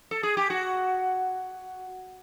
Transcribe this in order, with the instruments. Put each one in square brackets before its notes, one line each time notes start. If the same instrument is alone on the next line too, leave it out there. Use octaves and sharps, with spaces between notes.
[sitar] A4
G#4
G4
F#4